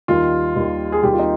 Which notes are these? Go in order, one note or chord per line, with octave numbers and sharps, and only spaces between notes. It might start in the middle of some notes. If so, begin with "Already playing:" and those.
D#2 D#3 G3 F4
D#2 D#3 G3
G#4
D#2 D#3 G3 G4
F4
D#4